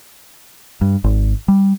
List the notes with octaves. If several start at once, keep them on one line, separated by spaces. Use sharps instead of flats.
G2
G#1
G3